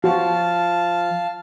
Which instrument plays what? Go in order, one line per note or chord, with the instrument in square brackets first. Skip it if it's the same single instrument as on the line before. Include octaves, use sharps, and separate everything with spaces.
[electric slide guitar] F3 [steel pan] F#4 [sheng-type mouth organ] F5 A5